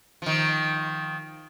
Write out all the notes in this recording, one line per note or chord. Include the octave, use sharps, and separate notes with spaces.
D#3 F3